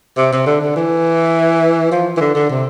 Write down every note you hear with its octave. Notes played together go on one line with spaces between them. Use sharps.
C3
C3
D3
D3
E3
F3
E3
D3
D3
C3